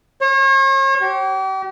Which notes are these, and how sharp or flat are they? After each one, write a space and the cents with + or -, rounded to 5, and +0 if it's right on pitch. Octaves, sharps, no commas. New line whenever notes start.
C#5 -40
G4 -40